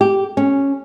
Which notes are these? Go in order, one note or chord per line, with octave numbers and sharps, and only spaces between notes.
G4
C#4